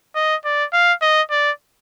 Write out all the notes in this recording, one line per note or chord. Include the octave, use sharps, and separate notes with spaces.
D#5
D5
F5
D#5
D5